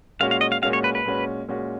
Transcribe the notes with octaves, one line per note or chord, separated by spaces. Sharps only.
A#2 G#3 C#4 F#4 F5
F5
D#5
F5
A#2 G#3 C#4 F#4 F5
C#5
B4
B4
A#2 G#3 C#4 F#4
A#2 G#3 C#4 F#4